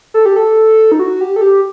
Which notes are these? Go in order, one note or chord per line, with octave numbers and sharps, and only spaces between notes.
A4
G4
A4
D#4
F#4
G4
A4
G4